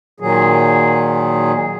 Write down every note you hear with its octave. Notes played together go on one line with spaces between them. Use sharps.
A#2 D#3 F#3 G#4